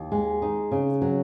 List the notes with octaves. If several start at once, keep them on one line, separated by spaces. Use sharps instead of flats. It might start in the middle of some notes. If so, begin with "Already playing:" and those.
Already playing: D#2
G#3
D#4
C#3
F#3